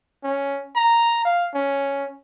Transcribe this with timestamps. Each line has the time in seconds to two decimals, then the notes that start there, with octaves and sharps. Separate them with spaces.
0.23 C#4
0.76 A#5
1.25 F5
1.54 C#4